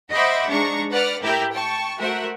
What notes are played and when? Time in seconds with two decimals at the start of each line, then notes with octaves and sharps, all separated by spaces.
0.12 C5 D#5 E5 F#5 B5 D6
0.48 G#2 D4 A#5 C#6
0.92 B4 D5 F#5 F6
1.22 A2 E4 G4 A#4 G6
1.54 G5 A5 C#6
2.00 A3 F#4 A#4 C5 E5 F#5